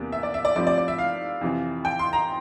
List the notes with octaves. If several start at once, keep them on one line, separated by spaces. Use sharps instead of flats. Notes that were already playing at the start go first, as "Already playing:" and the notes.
Already playing: E2 C3 G3 A#3 D4
E5
D5
E5
D5
G2 F3 A3 C4 D5
D5
D5
E5
F5
F2 C3 E3
G5
C6
A#5